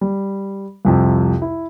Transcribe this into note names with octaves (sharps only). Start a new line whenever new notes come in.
G3
C2 F2 C3
E4